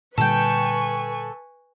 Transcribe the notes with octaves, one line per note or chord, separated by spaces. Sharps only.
A#2 D3 G3 A4 B4 G5 G#5 C#6